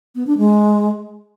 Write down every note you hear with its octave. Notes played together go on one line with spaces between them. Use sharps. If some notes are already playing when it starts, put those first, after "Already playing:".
B3
D4
G#3